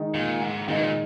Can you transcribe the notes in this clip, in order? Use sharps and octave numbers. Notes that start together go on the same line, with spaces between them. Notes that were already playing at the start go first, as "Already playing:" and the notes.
Already playing: D#3 G#3 D#4
A#2
G#2
A#2 D#3 G#3 D#4
B2
A#2